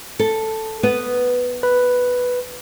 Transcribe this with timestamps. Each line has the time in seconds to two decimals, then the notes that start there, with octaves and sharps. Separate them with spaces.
0.19 A4
0.83 B3
1.63 B4